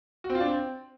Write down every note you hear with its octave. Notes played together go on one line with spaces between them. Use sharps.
F#4
C4
F4
D4
C4